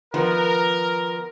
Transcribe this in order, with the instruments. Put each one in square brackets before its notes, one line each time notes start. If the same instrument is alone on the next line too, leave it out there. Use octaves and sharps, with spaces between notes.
[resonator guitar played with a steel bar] D#3 F3 B3 [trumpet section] A#4